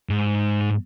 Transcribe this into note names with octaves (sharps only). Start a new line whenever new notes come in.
G#2